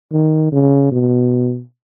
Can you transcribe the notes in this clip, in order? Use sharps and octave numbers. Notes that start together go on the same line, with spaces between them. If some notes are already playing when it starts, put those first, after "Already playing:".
D#3
C#3
B2